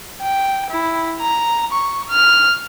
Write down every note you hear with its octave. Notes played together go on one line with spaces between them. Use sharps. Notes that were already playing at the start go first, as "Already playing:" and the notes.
G5
E4
A#5
C#6
F6